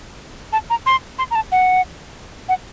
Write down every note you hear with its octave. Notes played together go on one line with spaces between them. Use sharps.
A5
A#5
C6
C6
A#5
A5
F#5
F#5